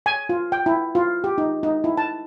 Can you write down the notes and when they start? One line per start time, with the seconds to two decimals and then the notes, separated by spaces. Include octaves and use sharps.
0.06 G#5
0.29 F4
0.52 G5
0.66 E4
0.95 F4
1.24 G4
1.38 D#4
1.63 D#4
1.84 E4
1.97 A5